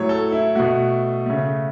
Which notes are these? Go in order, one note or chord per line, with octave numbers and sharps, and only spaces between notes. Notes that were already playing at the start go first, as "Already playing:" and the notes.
Already playing: A2 F#3 A3 C#5
A4
E4
B2 A3 F#4
C#3 A3